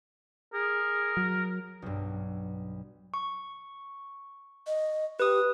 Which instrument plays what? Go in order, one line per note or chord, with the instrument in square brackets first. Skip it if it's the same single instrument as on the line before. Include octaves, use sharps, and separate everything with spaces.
[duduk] G#4 [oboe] A#4
[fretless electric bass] F#3
[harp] B1 G2
[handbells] C#6
[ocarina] D#5
[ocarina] G4 [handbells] B4 D#6